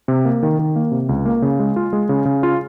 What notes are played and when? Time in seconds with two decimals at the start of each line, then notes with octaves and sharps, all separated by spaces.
0.08 C3
0.25 A#3
0.43 D#3
0.59 D#3
0.76 A#3
0.92 C3
1.09 C#2
1.26 A#3
1.42 C#3
1.60 G#3
1.76 F4
1.93 G#3
2.09 C#3
2.25 C#3
2.43 F4